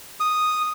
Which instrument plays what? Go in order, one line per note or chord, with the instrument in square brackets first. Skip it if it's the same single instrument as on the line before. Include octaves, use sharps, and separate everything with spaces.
[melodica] D#6